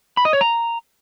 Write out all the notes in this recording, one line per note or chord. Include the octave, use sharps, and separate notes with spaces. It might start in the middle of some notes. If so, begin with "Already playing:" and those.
B5
D#5
C#5
A#5